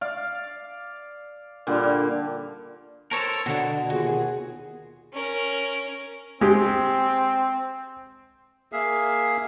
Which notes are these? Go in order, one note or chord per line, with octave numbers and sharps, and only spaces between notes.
D5 F5
A#2 D3 G3
A4 A#4 C5 C#5 A5
B2 D3 F#4 F#5
D#2 F4 F#4 G#4
C#4 A#4
G#3 C4 G4
A#3 G#4 E5 F5